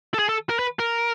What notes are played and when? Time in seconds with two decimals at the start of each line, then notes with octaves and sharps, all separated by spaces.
0.14 A4
0.19 G#4
0.29 A4
0.49 A#4
0.59 B4
0.79 A#4